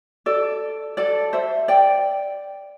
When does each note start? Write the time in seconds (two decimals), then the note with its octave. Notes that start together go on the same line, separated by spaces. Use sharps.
0.26 A4 D5
0.97 A4 D5
1.33 C5 E5
1.68 D5 G5